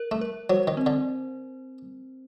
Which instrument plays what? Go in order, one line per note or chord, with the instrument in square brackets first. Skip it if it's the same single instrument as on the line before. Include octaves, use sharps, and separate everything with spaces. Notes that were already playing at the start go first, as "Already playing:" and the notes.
Already playing: [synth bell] A#4
[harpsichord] A3
[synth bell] A#4
[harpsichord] F#3 [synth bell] C5
[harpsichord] D#3
[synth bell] C4
[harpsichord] D3